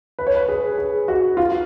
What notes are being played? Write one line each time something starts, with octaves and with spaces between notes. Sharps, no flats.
B4
C#5
B4
G#4
G#4
F#4
F4